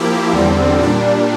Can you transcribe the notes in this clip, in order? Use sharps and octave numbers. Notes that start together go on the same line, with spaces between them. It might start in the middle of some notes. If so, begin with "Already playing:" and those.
Already playing: F3 A#3 E4 G4
E2 D3 G3 C4
A#2 G3 D4